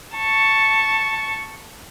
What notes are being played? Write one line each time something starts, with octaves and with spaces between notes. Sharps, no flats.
A5 C#6